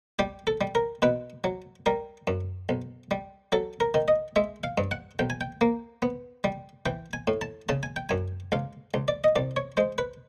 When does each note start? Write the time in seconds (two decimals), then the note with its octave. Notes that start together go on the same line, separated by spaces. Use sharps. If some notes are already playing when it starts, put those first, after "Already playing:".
0.19 G3 G4
0.47 A4
0.61 G3
0.75 A#4
1.02 B2 B4
1.44 F#3
1.86 G3 A#4
2.27 F#2
2.69 B1
3.11 G3
3.52 F#3 A4
3.80 A#4
3.94 D#3
4.08 D#5
4.36 G#3 E5
4.64 F5
4.78 G2
4.91 F#5
5.19 B1 G5
5.30 G#5
5.41 G5
5.61 A#3
6.02 B3
6.44 G3
6.86 E3 G5
7.13 G#5
7.27 A2
7.41 A5
7.69 C#3 A5
7.83 G#5
7.96 G5
8.09 F#2 G#5
8.52 C#2 F5
8.94 C#2
9.08 D5
9.24 D#5
9.36 C2 D5
9.56 C#5
9.77 G#3 C5
9.98 B4